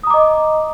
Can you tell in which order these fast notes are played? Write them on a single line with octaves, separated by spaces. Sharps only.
D#6 A#5 D6 D#5